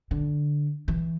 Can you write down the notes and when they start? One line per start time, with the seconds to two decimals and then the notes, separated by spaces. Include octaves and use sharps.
0.11 D3
0.88 E3